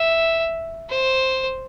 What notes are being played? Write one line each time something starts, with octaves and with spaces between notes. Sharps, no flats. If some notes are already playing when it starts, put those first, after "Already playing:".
Already playing: E5
C5